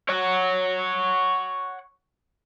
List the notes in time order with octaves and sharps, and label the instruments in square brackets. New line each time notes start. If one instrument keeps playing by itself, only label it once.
[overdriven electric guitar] C#5 F#5